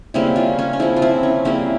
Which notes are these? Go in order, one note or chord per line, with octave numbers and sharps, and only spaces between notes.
C#3 G3 A#3 C4 E4
C#4 F4
C#4
C#4
C#3 F3 A#3 C4 E4
F4
C4 E4
C#4
C#3 G3 A#3 C4 E4